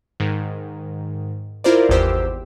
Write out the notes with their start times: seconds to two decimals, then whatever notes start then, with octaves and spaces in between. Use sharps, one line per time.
0.20 G#2 D#3
1.64 E4 F4 A#4 C5 D5
1.89 G#1 E2 G4 C5 E6